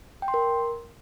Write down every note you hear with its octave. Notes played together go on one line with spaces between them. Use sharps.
G5
C6
A#4